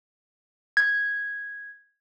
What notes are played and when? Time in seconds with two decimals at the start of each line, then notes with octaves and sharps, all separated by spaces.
0.77 G#6